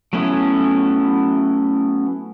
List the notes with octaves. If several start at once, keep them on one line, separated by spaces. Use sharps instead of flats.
F#3 A3 B3 C#4 E4